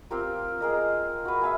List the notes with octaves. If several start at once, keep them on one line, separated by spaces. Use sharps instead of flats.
C4 F4 G4 A#4
G#4 A#4 D#5
F#4 B4
E5 F5 G#5